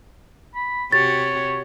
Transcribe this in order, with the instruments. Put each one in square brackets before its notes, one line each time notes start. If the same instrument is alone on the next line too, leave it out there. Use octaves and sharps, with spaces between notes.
[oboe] B5
[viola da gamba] C3 F#4 G4 [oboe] C#5 [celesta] A6